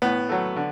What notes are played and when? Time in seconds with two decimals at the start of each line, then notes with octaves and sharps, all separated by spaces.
0.02 A2 B3
0.29 F#3 A3
0.56 D3